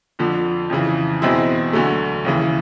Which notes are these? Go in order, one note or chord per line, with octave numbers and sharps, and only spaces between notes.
F2 D3 F3
F2 C#3 E3
E2 B2 G#3 C4 E4
D2 D3 F#3 A3
D#2 C#3 E3